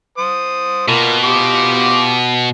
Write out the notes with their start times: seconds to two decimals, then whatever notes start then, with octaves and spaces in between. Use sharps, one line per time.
0.18 C5 D#6
0.88 B2 A#3 F4
1.25 F4 G4 D6